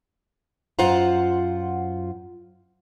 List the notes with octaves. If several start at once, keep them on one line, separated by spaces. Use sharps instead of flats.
F#2 F4 C5 F#5 A#5